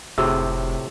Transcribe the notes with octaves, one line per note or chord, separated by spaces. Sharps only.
F1 A2 C3 F#4 G#4 E6